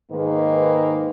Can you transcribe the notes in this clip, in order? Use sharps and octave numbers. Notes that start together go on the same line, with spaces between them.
G#2 D#3 G#3 A#3 B4